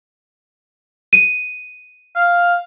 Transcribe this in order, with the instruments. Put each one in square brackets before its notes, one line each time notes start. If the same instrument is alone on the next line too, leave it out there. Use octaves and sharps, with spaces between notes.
[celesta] D#7
[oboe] F5